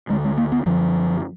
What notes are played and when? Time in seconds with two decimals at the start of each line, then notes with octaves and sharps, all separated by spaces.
0.09 D2 D3 G#3
0.24 G#3
0.38 A#3
0.52 B3
0.66 F#2 D3 F3